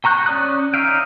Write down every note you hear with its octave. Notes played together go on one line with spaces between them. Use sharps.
G5 A#5 C#6 F#6 G6
C#4 D5 D#6 F#6
D#4 E5 F5 G5